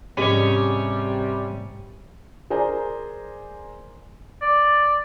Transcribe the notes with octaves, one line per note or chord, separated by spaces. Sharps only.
G#2 C3 G3 C#4 G4 G#4 C#5 D#5
G#4 A#4 C5 D5 G#5 A#5
D5